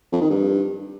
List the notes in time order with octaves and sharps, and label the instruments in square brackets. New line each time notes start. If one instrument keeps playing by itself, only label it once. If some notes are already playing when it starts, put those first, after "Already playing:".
[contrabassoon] F2
D#3
G2